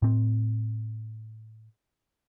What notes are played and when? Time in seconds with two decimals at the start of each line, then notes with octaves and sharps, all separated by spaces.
0.02 A2 C4